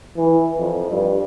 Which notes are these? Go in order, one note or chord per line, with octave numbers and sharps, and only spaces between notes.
E3
F2
G2